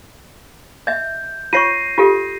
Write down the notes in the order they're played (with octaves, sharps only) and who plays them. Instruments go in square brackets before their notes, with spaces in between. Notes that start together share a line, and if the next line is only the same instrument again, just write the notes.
[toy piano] D#5 E5 [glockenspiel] G6
[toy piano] F4 C#5 C#6 [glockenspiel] A#6 C7 D#7
[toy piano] F4 G4 A4